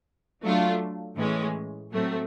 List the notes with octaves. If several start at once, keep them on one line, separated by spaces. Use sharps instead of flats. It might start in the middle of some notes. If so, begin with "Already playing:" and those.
F#3 A3 D4 F4
A2 E3 G#3 C#4
A2 F#3 A3 C4